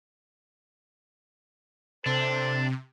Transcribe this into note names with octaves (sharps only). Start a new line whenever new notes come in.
C3 D4 A4 C5